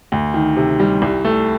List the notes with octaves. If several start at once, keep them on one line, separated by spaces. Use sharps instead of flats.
D2
D#3
C3
G3
C2
A3